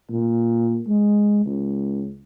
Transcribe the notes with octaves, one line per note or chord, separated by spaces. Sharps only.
A#2
G#3
C#2